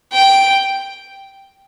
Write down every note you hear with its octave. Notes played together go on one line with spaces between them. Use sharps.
G5